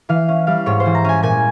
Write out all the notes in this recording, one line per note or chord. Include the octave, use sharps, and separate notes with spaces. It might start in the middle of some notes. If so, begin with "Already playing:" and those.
E3 F5
C#4
G3 F5
G#2 C#5
C5
E3
A#5
C#4 G#5
A#2 G#5